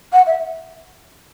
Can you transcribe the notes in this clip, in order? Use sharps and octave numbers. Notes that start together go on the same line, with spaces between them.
F#5
E5